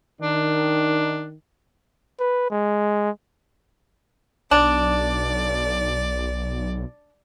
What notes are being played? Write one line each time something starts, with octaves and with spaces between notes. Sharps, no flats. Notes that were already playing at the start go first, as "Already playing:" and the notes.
D#3 D4
B4
G#3
B1 D4 D5